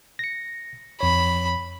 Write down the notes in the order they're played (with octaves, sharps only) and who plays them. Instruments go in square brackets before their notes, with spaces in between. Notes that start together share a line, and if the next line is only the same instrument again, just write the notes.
[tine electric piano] A#6 C#7
[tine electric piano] F2 C#5 [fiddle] B5